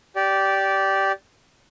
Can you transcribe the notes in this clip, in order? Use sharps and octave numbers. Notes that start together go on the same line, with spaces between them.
G4 D5